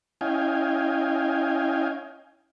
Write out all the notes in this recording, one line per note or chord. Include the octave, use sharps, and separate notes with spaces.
C#4 E4 D#5 F5 G5 G#5